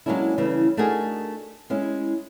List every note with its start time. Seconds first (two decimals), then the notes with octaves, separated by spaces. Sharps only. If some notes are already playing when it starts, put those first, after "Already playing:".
0.06 F#3 G#3 A#3 C#4 D4 E4
0.38 C#3 E3 G3 A3 C#4
0.77 A3 D4 D#4 F#4 G#4 A#4
1.70 G#3 C#4 E4